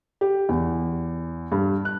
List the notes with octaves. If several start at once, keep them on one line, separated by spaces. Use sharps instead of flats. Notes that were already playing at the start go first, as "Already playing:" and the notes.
G4
E2
G2
F#6